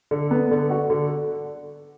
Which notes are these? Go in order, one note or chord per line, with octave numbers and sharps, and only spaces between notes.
D3
B3
D3
F#4
D3